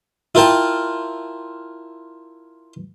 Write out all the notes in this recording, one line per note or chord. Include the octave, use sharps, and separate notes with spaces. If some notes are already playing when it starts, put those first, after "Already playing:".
E4 F4 A#4 G5 A5